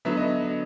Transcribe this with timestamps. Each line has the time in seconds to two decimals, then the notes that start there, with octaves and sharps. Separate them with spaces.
0.05 D3 F#3 B3 E5
0.17 D#5